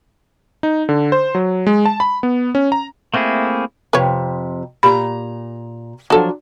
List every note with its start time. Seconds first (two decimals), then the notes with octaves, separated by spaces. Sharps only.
0.63 D#4
0.89 D3
1.12 C5
1.35 F#3
1.67 G#3
1.85 A5
2.00 B5
2.23 B3
2.55 C#4
2.72 A#5
3.14 A3 A#3 C4 E4 G#4
3.93 F2 C3 B4 C#5
4.83 A#2 G4 A#5 B5
6.10 F3 F#3 D4 F#4 A4